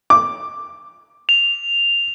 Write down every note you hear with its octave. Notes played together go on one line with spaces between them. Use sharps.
D6
F7